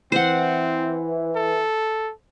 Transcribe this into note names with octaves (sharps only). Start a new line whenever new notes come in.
E3 C4 C5 F#5
A4